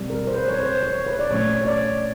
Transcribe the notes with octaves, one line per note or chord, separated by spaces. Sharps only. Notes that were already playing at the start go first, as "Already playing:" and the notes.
Already playing: B2 G3 C4
A#4
C5
B4
C#5
C5
C#5
B4
D5
A#2 F#3 A3 C#4 C#5
C#5
D5